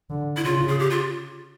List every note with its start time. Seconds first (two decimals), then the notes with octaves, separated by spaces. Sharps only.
0.10 D3
0.37 E4
0.44 C#3 F4
0.68 G#4
0.79 G4
0.90 F4